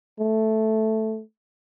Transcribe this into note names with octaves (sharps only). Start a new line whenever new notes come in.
A3